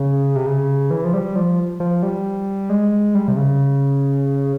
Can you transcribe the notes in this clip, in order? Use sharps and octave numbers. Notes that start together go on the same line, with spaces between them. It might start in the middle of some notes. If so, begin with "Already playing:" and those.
Already playing: C#3
C3
C#3
E3
F3
G3
F3
F3
G3
G#3
G3
C3
C#3